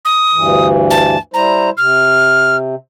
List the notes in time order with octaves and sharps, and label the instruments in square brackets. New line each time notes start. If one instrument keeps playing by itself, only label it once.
[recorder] D#6
[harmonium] D2 G2 E3
[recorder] A5
[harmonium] G3 E4 C5 [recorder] A#5
[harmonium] C3 [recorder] F6